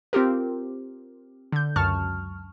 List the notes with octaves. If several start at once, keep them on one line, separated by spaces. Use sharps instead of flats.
C4 F4 G4 A#4
D3 G6
C#2 F#2 A5 C#6 F6